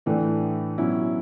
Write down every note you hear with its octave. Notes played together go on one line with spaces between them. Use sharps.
A2 E3 A3 D4
B2 F#3 C#4 E4